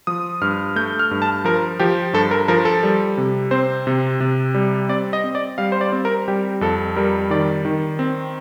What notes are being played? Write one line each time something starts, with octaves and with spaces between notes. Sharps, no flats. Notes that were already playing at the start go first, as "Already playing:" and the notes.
F3 D#6
G2 F6
A3 G6
F6
G2
A5
F3 A#4
F3 G4
G2 A4
A#4
F3 A#4
A4
G3
C3
C4 C5
C3
C3
G3
C4 D5
D#5
C4
D5
G3 F5
C5
D5
C4
A#4
G3 G4
F2 A4
G3 A#4
D#3 D5
D#3
C4